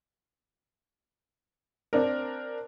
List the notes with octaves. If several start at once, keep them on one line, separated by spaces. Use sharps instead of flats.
C4 D4 A#4